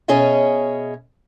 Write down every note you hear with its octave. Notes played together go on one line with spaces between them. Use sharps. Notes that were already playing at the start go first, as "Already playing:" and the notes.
B2 C#4 G#4 C#5 D#5 E5